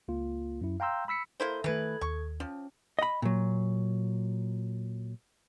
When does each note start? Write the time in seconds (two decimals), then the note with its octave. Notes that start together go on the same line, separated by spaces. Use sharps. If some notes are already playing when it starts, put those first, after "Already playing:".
0.08 C#2 A#3 F4
0.61 F#2 E4
0.80 F5 G5 A#5 C6 E6 G6
1.08 B5 E6 B6 C#7
1.40 A#3 E4 A4 A#4 C5 E5
1.64 D#3 E3 A3 A4 B4 G#6
2.01 D#2 C#6
2.40 F3 C#4
2.99 D#5 B5
3.22 A#2 F#3